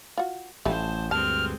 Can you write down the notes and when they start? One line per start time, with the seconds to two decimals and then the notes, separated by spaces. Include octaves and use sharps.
0.17 F4 F#4
0.65 A1 F3 G3 A3 C5 A5
1.11 D2 G2 G#3 C4 A5 F6